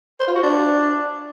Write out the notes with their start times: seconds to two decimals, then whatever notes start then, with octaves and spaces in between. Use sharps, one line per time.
0.20 C5
0.28 F4
0.36 F#4
0.43 D4